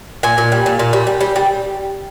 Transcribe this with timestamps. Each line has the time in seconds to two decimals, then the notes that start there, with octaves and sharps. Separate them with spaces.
0.23 A#2 G#5
0.38 A#2
0.52 G3
0.66 A#2
0.79 A#2
0.93 G3
1.07 G3
1.21 G3
1.36 G3